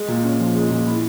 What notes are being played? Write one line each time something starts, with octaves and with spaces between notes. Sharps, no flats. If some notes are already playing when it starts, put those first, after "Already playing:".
Already playing: G#3
A#2
C#4
F3
G#3
A#2
E4